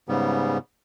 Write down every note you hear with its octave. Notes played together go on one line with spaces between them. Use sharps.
G#2 C#3 G3 B3